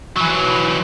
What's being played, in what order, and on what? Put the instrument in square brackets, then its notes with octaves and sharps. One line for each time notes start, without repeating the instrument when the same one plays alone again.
[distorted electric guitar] E3 F#3